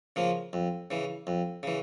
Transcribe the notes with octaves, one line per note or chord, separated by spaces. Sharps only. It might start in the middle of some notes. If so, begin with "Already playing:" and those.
C#3 F3 A#3
F2
C#3 E3
F2
C#3 E3